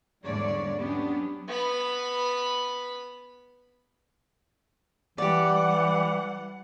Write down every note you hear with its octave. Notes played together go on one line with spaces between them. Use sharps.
E2 G#2 D3 G3 C#5 D5
F#3 B3 C#4 D4 G4
B3 B5
E3 G3 G4 D5 F#5